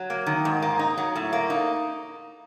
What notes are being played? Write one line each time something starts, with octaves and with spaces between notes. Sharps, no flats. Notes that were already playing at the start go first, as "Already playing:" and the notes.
Already playing: F#3
A#3
D#3
G#2
A#3
D#4
F#3
A2
A#3
D#4